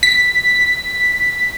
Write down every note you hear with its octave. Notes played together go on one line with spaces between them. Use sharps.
B6